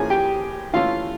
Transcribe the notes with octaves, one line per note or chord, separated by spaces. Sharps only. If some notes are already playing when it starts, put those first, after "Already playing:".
Already playing: A2 F3 A#3 C#4 G#4 G#5
G4 G5
E3 A3 C#4 F4 F5